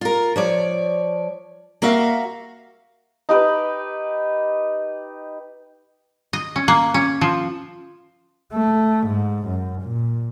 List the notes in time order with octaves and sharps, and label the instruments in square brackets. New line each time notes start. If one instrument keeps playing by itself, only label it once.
[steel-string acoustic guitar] F4 A#4
F3 C#5 D5
A#3 F#4 E5 F5
[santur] D#4 G4 B4
[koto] D#5
C#4
A#3
C#4
F3
[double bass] A3
G#2
F#2
A#2